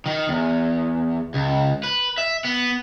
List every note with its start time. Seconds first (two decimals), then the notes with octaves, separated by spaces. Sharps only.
0.06 D#3
0.28 E2
1.34 C#2
1.83 B4
2.18 E5
2.45 B3